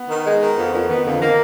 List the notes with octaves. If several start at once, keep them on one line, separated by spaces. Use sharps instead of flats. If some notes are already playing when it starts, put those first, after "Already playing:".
Already playing: B3
D#3
G#3
D#3
F2 B3
F2 A#3
D#3 B3
F2 D3
D#3 A#3